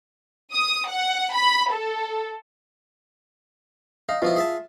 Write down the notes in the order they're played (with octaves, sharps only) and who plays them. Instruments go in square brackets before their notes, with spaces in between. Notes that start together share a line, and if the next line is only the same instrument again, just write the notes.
[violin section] D#6
F#5
B5
A4
[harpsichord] D#4 [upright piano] F5
[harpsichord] B2 F3 E4 [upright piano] F4
[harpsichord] G#4 E5 A5